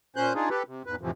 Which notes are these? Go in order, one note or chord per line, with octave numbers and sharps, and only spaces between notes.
A#2 C#4 C5 F#6 G6
D4 D#4 F4 G#4
G4 A4 B4
C3
E2 G#2 B4
F2 A2 C3 E3 F3